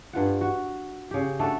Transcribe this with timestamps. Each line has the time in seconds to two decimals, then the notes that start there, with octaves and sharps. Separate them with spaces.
0.13 G2 F4 F#5
0.41 F#4
1.11 C#3 G4
1.39 A3 D4 F#4 A4